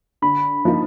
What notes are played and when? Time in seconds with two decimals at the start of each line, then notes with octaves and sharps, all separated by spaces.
0.22 D3 B5
0.65 F3 A#3 D#4